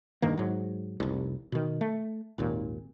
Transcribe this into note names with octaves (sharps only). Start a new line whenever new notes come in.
E1 G2 D#3 A#3
G#2 F#3
F1 C2
B2 D#3
A3
G#1 D#2 A#2